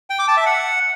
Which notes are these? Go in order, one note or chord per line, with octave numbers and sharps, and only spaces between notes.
G5
D6
A5
E5
F#5